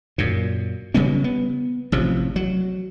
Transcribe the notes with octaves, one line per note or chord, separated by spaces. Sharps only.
F#2 A#2
C#3 G3 B3 C#4
B3
A1 C3 F3
F#3